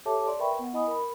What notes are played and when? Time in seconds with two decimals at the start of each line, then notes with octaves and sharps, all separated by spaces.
0.05 G4 A4 C#5 E5 A5 D6
0.27 D5 C6
0.39 A#4 B4 E5 G5 B5 C#6
0.59 B3 F#5
0.73 E4 D#5 G#5 B5 D#6
0.87 A#4 B5